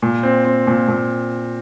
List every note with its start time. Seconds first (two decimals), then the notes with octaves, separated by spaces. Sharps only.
0.02 A#2
0.23 C4
0.45 C4
0.67 A#2
0.88 A#2